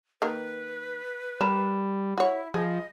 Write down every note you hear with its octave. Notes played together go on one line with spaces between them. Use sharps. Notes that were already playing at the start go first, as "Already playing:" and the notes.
D#3 A#3 A#4 B4
G3 A#4 D5 A#5 B5 E7
E4 F#4 C#5
F3 G#4 D#5